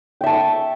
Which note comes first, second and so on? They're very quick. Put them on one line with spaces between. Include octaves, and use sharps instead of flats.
G5 E5 A5 C#6